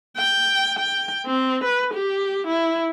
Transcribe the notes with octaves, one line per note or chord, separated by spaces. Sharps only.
G5
G5
C4
B4
G4
E4